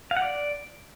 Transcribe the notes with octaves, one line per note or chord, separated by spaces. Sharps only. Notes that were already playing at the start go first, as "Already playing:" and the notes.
F5
F#5
D5